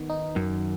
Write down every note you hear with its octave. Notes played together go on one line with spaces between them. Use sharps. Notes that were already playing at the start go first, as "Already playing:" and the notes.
Already playing: D#3 B3
D#4
F#2 D#3